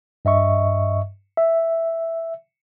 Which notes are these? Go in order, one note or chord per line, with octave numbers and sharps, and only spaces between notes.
G2 D#5 E5 C#6
E5